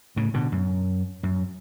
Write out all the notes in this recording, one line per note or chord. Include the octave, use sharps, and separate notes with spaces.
A2 C#3
B2 D3
F#2
F#2